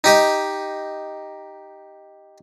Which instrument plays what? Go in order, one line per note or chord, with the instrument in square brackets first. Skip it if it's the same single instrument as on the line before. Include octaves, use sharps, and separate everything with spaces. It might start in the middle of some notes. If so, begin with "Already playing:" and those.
[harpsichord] D#4 G4 D#5